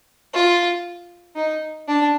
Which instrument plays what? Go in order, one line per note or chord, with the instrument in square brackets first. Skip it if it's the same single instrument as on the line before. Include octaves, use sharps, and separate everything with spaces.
[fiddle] F4
D#4
D4